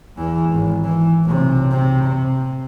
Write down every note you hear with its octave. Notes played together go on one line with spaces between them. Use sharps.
E2 E3
G#1
E3
B1 C3
C3
C3